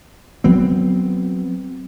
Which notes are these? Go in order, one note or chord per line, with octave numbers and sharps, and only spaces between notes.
F#3 B3 C4